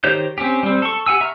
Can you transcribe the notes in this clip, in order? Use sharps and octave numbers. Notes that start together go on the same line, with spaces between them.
D#3 G4 C5 C#5 G6
C4 C#4 G4
G3 C4
A4 C#6
G4 F#5 G#5 E6
E5 A#5 C#6 F6